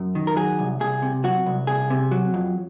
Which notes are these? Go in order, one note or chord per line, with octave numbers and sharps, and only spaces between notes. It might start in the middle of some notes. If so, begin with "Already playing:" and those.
Already playing: F#2
D#3
A#4
F#3 G#4
C2
C2 G#4
C3
F#3 F#4
C2
C2 G#4
C3
F#3
F2